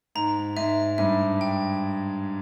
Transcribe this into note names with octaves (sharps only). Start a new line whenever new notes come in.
G#2 A#5
G#2 E5
G2 E5
G5